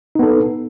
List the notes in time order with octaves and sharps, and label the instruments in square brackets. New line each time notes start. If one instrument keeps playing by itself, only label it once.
[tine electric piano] D#4
B3
A4